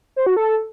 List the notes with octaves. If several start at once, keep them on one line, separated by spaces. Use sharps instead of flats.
C5
F#4
A4